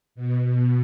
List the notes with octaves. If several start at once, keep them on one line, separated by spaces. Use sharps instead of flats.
B2
B2